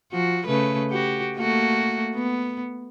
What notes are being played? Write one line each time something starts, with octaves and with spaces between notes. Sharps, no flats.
F3 F#4
C#3 A3 B4
F#4 G4
A3 A#3 F#4
B3